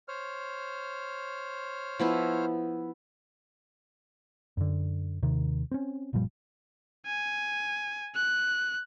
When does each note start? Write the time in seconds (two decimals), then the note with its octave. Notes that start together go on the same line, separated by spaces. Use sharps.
0.08 C5 C#5 F6
1.99 F3 B3 E4
4.57 F#2 D3
5.23 D#2 C3 D#3
5.71 C4 C#4
6.13 F#1 A#2 F3 G3
7.06 G#5
8.15 F#6